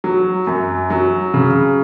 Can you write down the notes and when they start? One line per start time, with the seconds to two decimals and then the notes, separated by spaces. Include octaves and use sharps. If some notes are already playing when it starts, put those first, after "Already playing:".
0.04 F#3
0.47 F#2
0.90 F#3
1.34 C#3